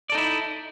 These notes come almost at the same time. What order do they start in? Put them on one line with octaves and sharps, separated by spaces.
D5 A4 D#4 E4